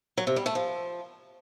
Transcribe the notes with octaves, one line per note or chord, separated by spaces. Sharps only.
F#3
C3
G3
A3
F3